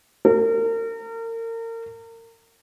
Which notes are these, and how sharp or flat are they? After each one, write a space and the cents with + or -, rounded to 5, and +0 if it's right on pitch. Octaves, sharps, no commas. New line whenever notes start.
A#4 -35